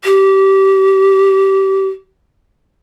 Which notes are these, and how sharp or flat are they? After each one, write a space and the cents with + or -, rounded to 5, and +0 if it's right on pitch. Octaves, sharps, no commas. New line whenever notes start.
G4 -20